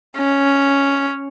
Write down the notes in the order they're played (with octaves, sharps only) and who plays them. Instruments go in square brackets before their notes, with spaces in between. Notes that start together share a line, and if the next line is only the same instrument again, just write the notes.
[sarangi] C#4